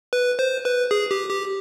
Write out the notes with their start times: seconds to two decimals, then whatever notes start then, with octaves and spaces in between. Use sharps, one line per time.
0.13 B4
0.39 C5
0.65 B4
0.91 G#4
1.11 G4
1.30 G4